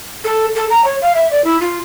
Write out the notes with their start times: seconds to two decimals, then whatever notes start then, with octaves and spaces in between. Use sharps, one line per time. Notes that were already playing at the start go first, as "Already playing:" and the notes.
0.24 A4
0.56 A4
0.70 A#5
0.85 C#5
1.02 F5
1.15 E5
1.31 D5
1.45 E4
1.61 F4